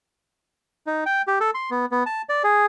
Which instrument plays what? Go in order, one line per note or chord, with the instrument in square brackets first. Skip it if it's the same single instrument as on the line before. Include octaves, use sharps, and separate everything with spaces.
[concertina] D#4
G5
G4
A4
C6
B3
B3
A5
D5
G#4